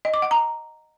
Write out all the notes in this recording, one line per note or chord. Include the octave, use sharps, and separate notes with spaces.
D#5
D6
F#5
A#5